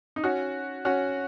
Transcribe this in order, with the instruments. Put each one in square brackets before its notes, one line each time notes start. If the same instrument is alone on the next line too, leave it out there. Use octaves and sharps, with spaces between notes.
[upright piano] D#4
C#4 F#4
C#4 F#4